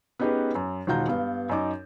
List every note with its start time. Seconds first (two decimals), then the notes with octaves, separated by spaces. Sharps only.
0.19 B3 C#4 D#4 G4 G#4 B4
0.55 F#2
0.87 E1 D#3 F4 F#5 A#5 G6
1.08 G2 B3 F5
1.49 F#2 D#4 D6